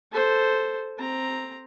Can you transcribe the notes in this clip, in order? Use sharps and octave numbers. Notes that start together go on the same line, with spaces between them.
A4 C5
C4 A#5